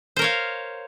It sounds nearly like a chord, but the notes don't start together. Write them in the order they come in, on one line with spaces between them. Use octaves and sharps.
C5 A#4 C#5 F5